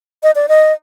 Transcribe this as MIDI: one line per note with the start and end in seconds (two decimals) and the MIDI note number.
0.23 0.31 75
0.35 0.46 74
0.49 0.73 75